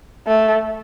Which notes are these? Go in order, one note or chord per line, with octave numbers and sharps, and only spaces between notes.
A3